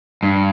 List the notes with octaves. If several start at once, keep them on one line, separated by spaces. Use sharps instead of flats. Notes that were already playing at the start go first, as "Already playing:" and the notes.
G2